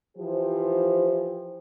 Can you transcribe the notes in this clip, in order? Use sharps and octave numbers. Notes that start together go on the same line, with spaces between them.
E3 F3 G4 C5